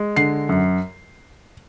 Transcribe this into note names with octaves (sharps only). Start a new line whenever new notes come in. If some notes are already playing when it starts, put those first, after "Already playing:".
Already playing: G#3
D3 C7
F#2